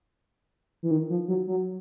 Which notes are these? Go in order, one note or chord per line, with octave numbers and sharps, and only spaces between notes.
E3
D#3
F3
F#3
F#3